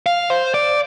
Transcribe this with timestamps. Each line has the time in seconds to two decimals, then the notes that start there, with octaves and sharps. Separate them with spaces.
0.06 F5
0.30 C5
0.54 D5